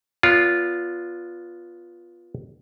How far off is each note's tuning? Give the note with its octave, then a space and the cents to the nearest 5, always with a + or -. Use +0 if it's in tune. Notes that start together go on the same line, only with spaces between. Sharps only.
B3 -15 F4 +0 D5 -40